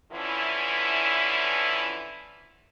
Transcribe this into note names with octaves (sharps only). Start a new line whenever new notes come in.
D3 E3 F3 C#4 E4